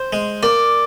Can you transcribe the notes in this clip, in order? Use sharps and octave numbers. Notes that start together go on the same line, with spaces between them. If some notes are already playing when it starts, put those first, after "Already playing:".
Already playing: C5
G#3
A#3 D5